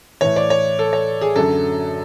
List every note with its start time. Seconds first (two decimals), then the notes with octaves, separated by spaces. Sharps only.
0.21 A2 E3 C#5
0.36 D5
0.50 C#5
0.79 A4
0.93 C#5
1.21 G#4
1.36 F#2 D3 F#3 A4